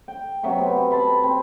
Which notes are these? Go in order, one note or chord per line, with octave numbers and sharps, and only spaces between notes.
G5
C3 F#3 E5 C#6
B3 C4
A5 B5 C6
C4